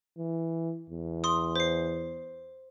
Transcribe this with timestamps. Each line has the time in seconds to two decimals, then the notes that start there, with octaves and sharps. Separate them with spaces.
0.18 E3
0.90 E2
1.24 C6 D#6
1.56 C5 C7